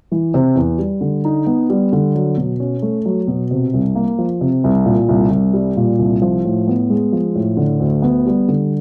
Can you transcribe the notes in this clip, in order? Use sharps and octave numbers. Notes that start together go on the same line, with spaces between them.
E3
C3
E2
G3
D3
D#4
B3
G3
D3
F#3
B2
C#4
A3
F#3
B2
C3
C2
A#3
F3
C3
C2
A#2
C2
C2
G3
A#2
C2
F3
A2
B3
G#3
F3
A2
D3
D2
B3
G3
D3